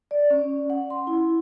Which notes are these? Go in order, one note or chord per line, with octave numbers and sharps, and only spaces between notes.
D5
C#4
F#5
C6
E4